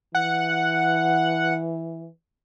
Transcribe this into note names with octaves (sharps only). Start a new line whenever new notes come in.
E3 F#5